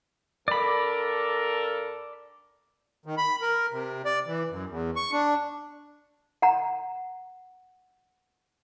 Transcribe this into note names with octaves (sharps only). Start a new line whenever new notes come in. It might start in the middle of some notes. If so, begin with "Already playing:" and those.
G2 A4 A#4 D5 B5
D#3
B5
A#4
C3
D5
E3
F#2
E2
C#6
D4
F#5 A#5